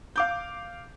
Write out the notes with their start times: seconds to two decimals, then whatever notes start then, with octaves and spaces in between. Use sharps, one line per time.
0.16 F5 D6 G6